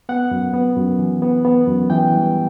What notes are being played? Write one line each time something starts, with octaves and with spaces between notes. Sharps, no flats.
B3 F#5
F#2
B3
F#2
E3
B3
B3
F#2
E3 G5
G3